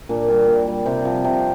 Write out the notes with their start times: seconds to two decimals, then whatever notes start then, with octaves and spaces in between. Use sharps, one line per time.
0.09 A#2 D4
0.28 G3
0.48 A#2
0.67 G3
0.86 C3 C4
1.05 F3
1.24 C3